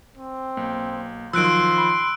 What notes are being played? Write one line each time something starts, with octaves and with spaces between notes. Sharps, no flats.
C4
B1 A#3
C2 D#3 F3 F#3 C6 E6 F#6 D7
B5